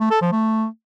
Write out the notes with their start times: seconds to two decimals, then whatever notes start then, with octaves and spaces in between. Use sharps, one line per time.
0.01 A3
0.11 A4
0.22 F3
0.32 A3